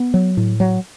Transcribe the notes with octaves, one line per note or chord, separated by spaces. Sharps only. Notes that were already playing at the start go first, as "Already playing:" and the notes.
Already playing: B3
F#3
A2
F#3